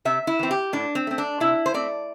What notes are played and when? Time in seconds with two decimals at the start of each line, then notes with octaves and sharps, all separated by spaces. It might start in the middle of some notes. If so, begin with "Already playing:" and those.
0.05 C3 E5
0.27 E4
0.39 E3 C4
0.51 G4
0.73 A2 D4
0.95 C4
1.07 A3 C4
1.18 D4
1.40 C3 E4
1.66 C5
1.74 A3 C4 D5